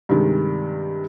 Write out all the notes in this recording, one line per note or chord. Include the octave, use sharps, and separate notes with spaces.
G2 C3 D#3 G#3